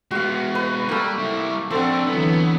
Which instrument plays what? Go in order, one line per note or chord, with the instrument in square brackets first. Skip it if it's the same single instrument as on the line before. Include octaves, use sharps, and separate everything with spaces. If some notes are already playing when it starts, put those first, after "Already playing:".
[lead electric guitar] G#3 B3 [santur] F#4 F5
[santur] B4
[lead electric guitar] G3 [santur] A3 A#3
[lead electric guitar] G3 E4
[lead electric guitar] F3 D4 [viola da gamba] C4 [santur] A4 F#5
[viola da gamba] D3 E3 F#3 [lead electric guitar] B3